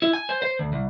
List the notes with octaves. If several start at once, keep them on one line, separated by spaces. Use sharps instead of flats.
E4
G#5
C5
C5
D2
C2